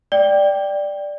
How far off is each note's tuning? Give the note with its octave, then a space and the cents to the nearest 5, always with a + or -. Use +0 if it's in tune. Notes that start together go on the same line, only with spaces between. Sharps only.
D5 +0 G5 +0